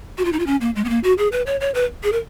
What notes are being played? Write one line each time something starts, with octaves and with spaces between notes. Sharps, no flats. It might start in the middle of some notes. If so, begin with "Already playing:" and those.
F#4
F4
D#4
F4
C#4
A#3
G#3
B3
A#3
F#4
G#4
B4
C#5
C#5
B4
G#4
A#4